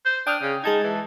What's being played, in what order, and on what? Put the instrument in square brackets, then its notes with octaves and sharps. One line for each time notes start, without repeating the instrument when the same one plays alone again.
[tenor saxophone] C5
[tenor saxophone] D4 [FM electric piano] G5 D#6 F6
[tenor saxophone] C#3
[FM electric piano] G#3 A5 G#6 [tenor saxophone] D#4
[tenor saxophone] E3